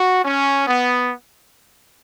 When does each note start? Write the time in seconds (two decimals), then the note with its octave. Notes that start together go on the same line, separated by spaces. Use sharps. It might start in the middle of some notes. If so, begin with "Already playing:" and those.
Already playing: F#4
0.24 C#4
0.67 B3